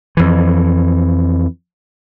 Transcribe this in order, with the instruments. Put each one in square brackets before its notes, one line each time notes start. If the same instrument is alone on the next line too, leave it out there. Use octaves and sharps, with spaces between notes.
[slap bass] F2 E3